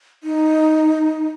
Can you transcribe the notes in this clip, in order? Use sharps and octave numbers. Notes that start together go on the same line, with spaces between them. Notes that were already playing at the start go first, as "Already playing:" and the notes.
D#4